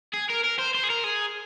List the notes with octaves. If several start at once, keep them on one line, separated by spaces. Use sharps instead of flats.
G#4
A#4
A#4
C5
C5
G#4
A#4
G#4